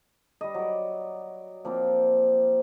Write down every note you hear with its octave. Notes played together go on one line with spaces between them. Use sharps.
G3 D#5
F#3 D5
F3 A#3 C4 F4